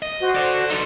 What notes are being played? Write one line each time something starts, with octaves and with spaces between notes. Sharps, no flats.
D#5
F#4 C5
A4 D5
D#4 A4 D5 C6